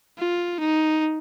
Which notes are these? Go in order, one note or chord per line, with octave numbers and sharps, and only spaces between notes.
F4
D#4